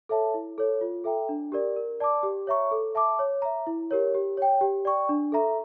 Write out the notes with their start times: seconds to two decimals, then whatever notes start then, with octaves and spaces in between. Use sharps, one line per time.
0.09 A4 C#5 E5 A5
0.34 E4
0.58 A4 C#5
0.81 F4
1.04 A4 E5 G5 A#5
1.29 D4
1.52 G4 A#4 D5
1.76 A#4
2.00 D5 A5 D6
2.23 G4
2.47 C#5 E5 A#5 C#6
2.71 A4
2.95 E5 A5 D6
3.19 C#5
3.42 E5 A#5
3.67 E4
3.91 G4 A#4 C#5
4.14 G4
4.37 C#5 G5
4.61 G4
4.85 D5 G5 C#6
5.09 D4
5.32 A4 E5 A#5